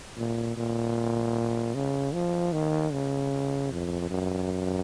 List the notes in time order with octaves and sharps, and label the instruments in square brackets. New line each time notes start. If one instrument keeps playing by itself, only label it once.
[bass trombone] A#2
A#2
C#3
F3
D#3
C#3
F2
F#2